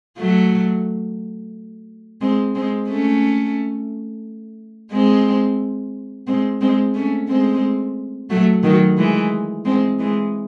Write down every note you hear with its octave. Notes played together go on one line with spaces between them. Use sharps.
F#3 A3
G#3 C4
G#3 C4
A3 C#4
G#3 C4
G#3 C4
G#3 C4
A3 C#4
G#3 C4
F#3 A3
D#3 F#3
E3 G#3
G#3 C4
E3 G#3